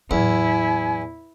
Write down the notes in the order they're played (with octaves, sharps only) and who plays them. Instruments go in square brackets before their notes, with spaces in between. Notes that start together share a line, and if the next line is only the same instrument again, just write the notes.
[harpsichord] E2 [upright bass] A2 F#3 [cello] E4 [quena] G#5